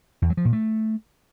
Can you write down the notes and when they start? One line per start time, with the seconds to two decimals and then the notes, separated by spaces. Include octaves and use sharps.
0.22 E2
0.30 F#3
0.37 F3
0.45 A#2
0.53 A3